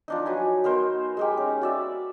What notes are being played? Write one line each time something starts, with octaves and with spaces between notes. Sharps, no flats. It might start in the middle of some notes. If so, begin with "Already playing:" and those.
F3 D4 D#4
F#3 D#4 B4 G#5
B3 D#4 A#4 C5
G#3 D#4 G4
C#4
F#4 D5 E5